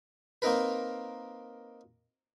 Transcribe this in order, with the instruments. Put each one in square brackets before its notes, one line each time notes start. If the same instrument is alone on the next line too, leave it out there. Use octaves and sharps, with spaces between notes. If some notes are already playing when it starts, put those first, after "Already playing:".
[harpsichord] A#3 C4 D#4 A#4 B4